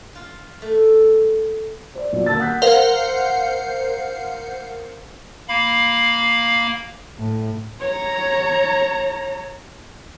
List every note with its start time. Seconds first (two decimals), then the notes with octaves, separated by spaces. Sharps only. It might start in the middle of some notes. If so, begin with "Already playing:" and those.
0.15 F4
0.62 A3
1.95 C5 D5
2.13 B1 A#2 D5
2.26 D#1 A#3 A5 E6 A6
2.39 F#5 D#6 F#6 G6 B6
2.62 A#4 C5 F5 F#5
5.48 A#3 F5 B5
7.19 A2
7.80 C#5 A#5